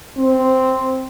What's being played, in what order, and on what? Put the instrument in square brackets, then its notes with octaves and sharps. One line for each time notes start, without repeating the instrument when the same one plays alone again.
[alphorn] C4